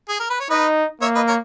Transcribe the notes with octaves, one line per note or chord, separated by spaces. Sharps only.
G#4
A#4
B4
C#5
D#4 B4 D#5
A#3 C#5 E5
B4 D#5
A#4 C#5